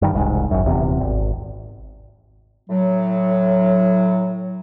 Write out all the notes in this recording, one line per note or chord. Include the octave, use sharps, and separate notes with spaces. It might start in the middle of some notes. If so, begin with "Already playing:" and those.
G2 D#3
E1 C2 G#2
G#1 F#2
D#1 E2 C3
G#1
A2 F#3